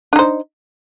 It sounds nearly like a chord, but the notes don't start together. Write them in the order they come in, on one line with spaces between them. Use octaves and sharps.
D4 D#4 C5